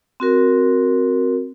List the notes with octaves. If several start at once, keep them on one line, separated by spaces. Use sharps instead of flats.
C4 F#4 A#4